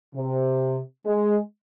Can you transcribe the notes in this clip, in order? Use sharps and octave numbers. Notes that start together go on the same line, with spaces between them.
C3
G#3